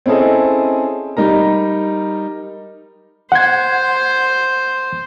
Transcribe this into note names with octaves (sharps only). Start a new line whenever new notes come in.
C4 C#4 E4 G#4 A4 D#5
G3 D#4 A#4 A#5
C5 F#5 G#6